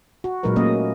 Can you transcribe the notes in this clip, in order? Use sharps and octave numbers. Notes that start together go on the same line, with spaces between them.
F#4
A#2 F#3 G#3 D#4 A#4 B4
F#3 A3 A#3 C#4 D#5